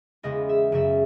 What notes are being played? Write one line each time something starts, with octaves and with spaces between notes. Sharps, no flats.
E2 C#3 G#3 B3 D#5
E5
F#2 C#3 F#3 E5